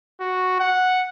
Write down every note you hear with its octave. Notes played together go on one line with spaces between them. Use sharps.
F#4
F#5